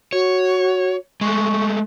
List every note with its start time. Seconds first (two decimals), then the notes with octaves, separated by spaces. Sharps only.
0.13 F#4 C#5
1.21 G#3 A3 C#6